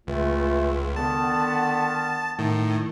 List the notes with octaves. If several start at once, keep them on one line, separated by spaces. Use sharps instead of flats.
C#2 E3 A3 F4
D3 D#3 B3 A5
A2 D#3